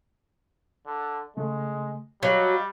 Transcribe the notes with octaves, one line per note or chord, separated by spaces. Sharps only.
D3
C#3 G#3 A3
F#3 G3 D#5 F5